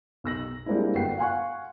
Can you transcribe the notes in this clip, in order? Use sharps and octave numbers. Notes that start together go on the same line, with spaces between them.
B1 E6 A#6 F#7
G3 G#3 A#3 C4 D4 E4
G1 F#4 G5 C7
F5 F#5 G#5 C6 C#6 F#6